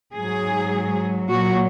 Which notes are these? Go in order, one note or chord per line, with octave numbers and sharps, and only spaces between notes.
G#2 F#3 G#4
A#2 F#3 F#4